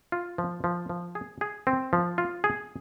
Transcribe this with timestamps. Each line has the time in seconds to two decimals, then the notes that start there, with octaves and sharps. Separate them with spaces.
0.12 F4
0.38 F3
0.64 F3
0.89 F3
1.15 G#4
1.41 G#4
1.67 C4
1.93 F3
2.18 F4
2.44 G#4